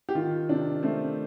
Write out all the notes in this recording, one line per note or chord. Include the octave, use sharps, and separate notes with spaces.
G4
D#3 F4
C3 D4
A3 C4